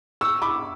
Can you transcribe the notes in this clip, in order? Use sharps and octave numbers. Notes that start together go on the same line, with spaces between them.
C#6 E6
B5 D6